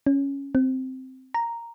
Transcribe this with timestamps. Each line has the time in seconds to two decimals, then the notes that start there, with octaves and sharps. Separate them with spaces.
0.07 C#4
0.55 C4
1.34 A#5